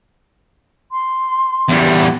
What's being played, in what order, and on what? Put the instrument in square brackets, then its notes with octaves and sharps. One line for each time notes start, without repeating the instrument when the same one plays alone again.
[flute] C6
[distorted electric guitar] E2 G3